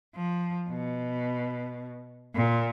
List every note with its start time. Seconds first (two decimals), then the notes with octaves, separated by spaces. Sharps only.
0.15 F3
0.70 B2
2.36 A#2